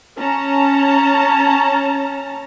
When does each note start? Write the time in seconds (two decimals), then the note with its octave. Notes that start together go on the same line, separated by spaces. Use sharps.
0.18 C#4 A5 A#5